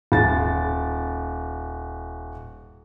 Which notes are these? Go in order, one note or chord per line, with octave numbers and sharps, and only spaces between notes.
D#1 A6